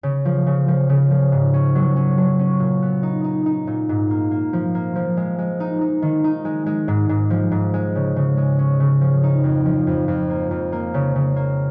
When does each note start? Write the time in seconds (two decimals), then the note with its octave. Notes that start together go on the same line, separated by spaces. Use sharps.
0.03 C#3
0.25 F3
0.47 C#3
0.68 F3
0.89 C#3
1.11 F3
1.32 G#2
1.54 C#4
1.75 F#3
1.96 C#4
2.18 F#3
2.39 C#4
2.60 A#2
2.82 B3
3.03 D#4
3.24 D#4
3.46 D#4
3.67 A#2
3.89 G#2
4.10 A#3
4.31 A#3
4.53 F3
4.75 A#3
4.95 F3
5.17 G#3
5.38 G#3
5.60 D#4
5.81 D#4
6.02 D#3
6.24 D#4
6.45 G#3
6.66 G#3
6.88 G#2
7.09 G#2
7.30 F3
7.51 G#2
7.74 G#3
7.95 C#3
8.16 C#3
8.37 G#3
8.59 C#4
8.80 C#3
9.01 F3
9.23 D#4
9.44 F2
9.66 F3
9.87 F2
10.08 F2
10.30 A#3
10.51 F2
10.72 A#3
10.94 C#3
11.15 C#3
11.36 A#3